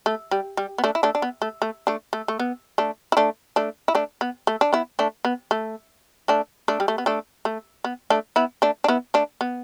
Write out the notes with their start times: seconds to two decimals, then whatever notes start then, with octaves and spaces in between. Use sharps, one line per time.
0.06 A3
0.31 G3
0.57 G3
0.78 B3
0.84 A3 D4
0.95 E4
1.03 A3 D4
1.15 D4
1.22 B3
1.42 A3
1.62 A3
1.87 A3 D4
2.13 A3
2.28 A3
2.39 B3
2.78 A3 D4
3.12 E4
3.17 A3 D4
3.56 A3 D4
3.88 E4
3.95 A3 D4
4.21 B3
4.47 A3
4.61 D4
4.73 B3 E4
4.99 A3 D4
5.25 B3
5.51 A3
6.28 A3 D4
6.68 A3 D4
6.80 G3
6.88 A3
6.98 B3
7.06 A3 D4
7.45 A3
7.84 B3
8.10 A3 D4
8.36 B3 E4
8.62 A3 D4
8.84 D4
8.88 B3 E4
9.14 A3 D4
9.41 B3